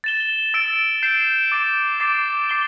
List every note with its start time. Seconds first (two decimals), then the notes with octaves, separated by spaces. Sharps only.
0.04 A6 E7 G7
0.54 E6 A6 D7
1.03 G6 C7 E7
1.52 D6 A6 D7
2.00 D6 A6 C7
2.49 D6 C7 G7